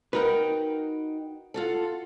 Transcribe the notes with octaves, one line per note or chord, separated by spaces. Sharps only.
D#4 F#4 A#4 B4 G5
F4 F#4 A4